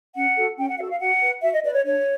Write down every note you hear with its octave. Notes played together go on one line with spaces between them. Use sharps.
C#4 F#5
F#4 A4
C#4 G5
F#5
F#4 A4 F5
F5
F#4 F#5
B4
F#4 E5
D#5
B4 D5
C#5
D4 C#5